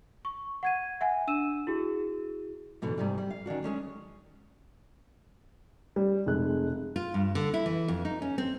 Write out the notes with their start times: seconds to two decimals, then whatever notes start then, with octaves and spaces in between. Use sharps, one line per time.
0.25 C#6
0.63 F#5 G#6 D#7
1.01 E5 F#5 G#5
1.27 D4 E6 D#7 E7
1.67 E4 F#4 G#4
2.82 G#2 B2 D3 E3
2.98 G#2 C3 G3
3.18 G3
3.30 F5
3.46 D#3 C#4 D4 F#4
3.63 G#3 A3 C#4 D4
5.96 G3
6.26 F1 G#3 F#6
6.96 F4
7.14 G2
7.35 D3
7.54 E4
7.66 E3
7.88 F2
8.05 D#4
8.22 C#4
8.38 C4